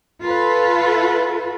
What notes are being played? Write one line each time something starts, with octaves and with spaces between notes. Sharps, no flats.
F4 A4 B4